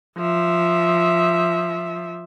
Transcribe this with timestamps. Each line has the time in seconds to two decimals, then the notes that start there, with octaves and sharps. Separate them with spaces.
0.17 F3 E5